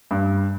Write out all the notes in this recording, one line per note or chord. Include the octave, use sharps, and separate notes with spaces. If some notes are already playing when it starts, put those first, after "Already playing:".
G2